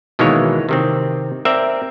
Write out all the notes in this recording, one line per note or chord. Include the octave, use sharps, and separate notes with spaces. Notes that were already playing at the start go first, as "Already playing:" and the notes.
B2 D#3 E3 G#3 A#3 C#5
C3 D#3 C4
C4 A#4 D5 E5